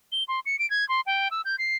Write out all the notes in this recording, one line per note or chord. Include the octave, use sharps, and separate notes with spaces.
G7
C6
C#7
D7
G#6
C6
G5
E6
G6
C7